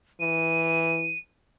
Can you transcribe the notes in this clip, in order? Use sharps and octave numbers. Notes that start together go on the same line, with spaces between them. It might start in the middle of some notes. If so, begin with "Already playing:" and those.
E3 D#7